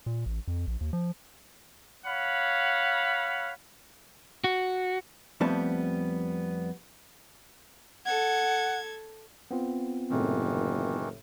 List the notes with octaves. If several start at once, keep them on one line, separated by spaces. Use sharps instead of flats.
A#2
A1
F2
A#1
D#2
F3
C#5 F5 F#5 B5
F#4
F2 G3 A3 B3 C4 A5
A4 F#5 G#6
B3 C4 F4
F#1 A2 C3 D#3 E3